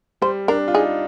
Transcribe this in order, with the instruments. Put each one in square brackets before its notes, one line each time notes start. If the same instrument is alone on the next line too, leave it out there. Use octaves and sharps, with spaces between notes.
[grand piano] G3 [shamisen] C5
[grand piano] D4 [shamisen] A#4
[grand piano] F4
[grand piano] D#4 [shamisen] G#4